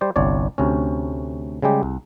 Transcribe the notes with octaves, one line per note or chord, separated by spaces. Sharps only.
G3 C5 D5
G1 C2 C#5 D5
D2 C3 C#4
C#3 G3 G#3 G4
C2